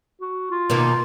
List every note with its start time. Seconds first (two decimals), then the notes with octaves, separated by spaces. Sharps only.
0.21 F#4
0.51 F4
0.70 B2 D#3 A#3